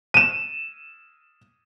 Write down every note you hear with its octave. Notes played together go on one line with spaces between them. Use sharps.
D#7 E7